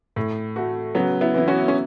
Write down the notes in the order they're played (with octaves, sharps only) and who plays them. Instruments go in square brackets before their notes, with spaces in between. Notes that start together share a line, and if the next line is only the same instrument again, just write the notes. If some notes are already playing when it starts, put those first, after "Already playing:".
[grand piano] A2
A3 F#4
[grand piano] C#3 [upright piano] F#3 B3
[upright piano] B3 E4
[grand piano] E3 B3 E4
[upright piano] C#4 F#4
C#4